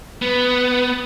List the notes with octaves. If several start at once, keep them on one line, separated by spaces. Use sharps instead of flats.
B3